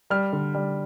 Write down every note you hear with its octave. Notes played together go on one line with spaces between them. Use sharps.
G3 F6
D3
G3